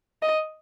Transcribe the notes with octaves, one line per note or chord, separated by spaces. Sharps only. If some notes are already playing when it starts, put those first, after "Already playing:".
D#5